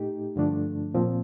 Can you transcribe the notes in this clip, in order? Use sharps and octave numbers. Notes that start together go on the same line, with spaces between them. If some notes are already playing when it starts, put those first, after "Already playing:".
Already playing: A2 A3 D#4 G4
G2 D3 F3 A3 D4
A#2 F3 C4